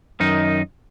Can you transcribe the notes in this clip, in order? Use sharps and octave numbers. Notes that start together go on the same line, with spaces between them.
F#2 D#3 D#4